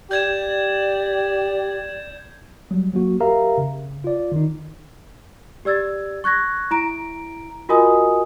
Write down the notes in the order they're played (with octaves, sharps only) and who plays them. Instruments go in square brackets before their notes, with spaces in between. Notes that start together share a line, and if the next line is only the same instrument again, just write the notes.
[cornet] G4 [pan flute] D5 [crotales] G6 G#6 E7
[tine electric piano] F#3 G3
F#3 A#3 F#4
G4 A#4 E5 F5 A#5
C#3
F4 D5
D#3 D#4
[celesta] G4 D5 E6 G#6 A6
C#6 F#6 G#6 A#6
E4 A#5 D7
F4 F#4 A#4 D#5 G#5 D#6